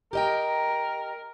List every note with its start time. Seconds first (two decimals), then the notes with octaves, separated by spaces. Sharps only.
0.13 G4 A#4 D#5 G5